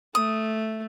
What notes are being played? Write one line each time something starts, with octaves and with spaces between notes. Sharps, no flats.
A3 D#6